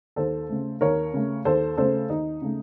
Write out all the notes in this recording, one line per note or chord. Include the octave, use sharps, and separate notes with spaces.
D#2 A4 C5
C#3 A3
D#2 A#4 C#5
C#3 A3
D#2 A4 C5
C#3 A3 A4 C5
D#2 D#4
C#3 A3